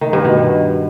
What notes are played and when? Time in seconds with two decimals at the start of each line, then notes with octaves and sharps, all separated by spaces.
0.01 D#3
0.13 G2
0.25 B2